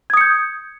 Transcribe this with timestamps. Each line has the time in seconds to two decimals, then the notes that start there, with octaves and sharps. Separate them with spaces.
0.10 G#6
0.14 D#6
0.17 C#7
0.21 G6